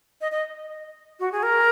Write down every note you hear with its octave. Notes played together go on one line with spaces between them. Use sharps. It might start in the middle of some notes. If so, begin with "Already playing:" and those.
D#5
D#5
F#4
G#4
A#4